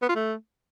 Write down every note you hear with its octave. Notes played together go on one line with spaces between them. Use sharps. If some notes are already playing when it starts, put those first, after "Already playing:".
B3
F4
A3